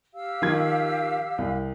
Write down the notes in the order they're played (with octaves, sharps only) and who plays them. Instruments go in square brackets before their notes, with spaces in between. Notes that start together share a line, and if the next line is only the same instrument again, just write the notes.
[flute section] G4 F5 E6
[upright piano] D#3 F3 G#6
C2